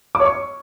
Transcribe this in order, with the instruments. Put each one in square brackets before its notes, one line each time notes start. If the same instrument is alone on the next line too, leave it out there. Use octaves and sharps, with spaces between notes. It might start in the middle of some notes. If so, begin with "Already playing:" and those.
[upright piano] D6
C#5
C#6